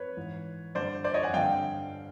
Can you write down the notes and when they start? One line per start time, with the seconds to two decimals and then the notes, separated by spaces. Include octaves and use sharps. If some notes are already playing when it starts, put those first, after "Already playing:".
Already playing: B4 C#5
0.17 G#2 E3
0.75 G2 D3 C5 D5
1.04 C5 D5
1.14 C#5 D#5
1.23 F#5 G#5
1.34 G2 D3 F5 G5